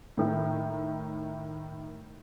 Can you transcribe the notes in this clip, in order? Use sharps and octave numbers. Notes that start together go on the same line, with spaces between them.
A2 D#3 E4